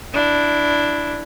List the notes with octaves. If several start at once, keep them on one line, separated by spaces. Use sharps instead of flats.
D4 E4